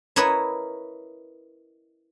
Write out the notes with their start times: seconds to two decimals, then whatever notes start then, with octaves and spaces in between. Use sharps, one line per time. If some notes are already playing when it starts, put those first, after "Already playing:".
0.16 E4 A#4 B4 C#5 D#5